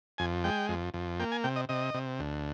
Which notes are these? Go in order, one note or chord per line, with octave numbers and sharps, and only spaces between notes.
F2 G#5
G#3 G5
F2
F2
A#3 G5
G#5
C3 G5
D#5
C3 D#5
C3
D2